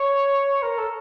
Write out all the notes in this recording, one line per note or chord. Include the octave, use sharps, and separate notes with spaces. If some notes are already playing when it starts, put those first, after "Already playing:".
Already playing: C#5
A#4
A4